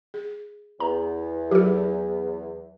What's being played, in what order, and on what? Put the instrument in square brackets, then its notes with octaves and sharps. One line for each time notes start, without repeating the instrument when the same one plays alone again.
[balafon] G#4
[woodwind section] E2 [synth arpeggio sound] A#5
[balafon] F#3 F4 [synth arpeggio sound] G4 A4